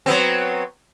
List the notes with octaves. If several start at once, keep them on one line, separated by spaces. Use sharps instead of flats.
F#3 B3 C4